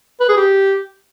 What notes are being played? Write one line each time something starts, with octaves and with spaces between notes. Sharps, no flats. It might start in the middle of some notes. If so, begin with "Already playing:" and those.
B4
G#4
G4